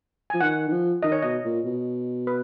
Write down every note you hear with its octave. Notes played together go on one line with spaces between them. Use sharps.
F3 G#5
D#3 F#5
D#3
F3
D#3 D#5
C#5
B2 D#5
A#2
B2
B4